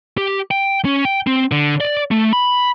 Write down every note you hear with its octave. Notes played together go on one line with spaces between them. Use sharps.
G4
G5
C#4
G5
C4
D3
D5
A3
B5